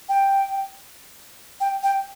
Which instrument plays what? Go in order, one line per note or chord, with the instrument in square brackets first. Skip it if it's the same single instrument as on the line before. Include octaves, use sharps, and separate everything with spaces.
[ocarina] G5
G5
G5